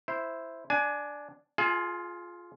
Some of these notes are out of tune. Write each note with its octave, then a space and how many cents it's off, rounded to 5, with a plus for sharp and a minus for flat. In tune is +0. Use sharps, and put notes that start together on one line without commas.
E4 +0 C5 +0
D4 +0 G#5 +25
F4 +0 G#4 +35 G#5 +0